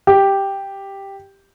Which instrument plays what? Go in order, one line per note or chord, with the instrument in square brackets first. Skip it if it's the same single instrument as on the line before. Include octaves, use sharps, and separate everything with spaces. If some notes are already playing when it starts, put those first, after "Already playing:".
[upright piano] G4